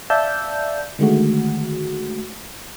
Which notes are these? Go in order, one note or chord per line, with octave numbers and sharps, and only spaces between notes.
D5 E5 F5 A5 E6 G6
D3 D#3 G#3 A3 F#4